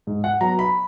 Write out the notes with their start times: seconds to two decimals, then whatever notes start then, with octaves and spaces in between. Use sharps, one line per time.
0.07 G#2
0.24 F#5
0.41 F#3 B3 A#5
0.59 B5